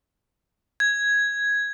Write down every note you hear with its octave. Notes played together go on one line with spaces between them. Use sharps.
G#6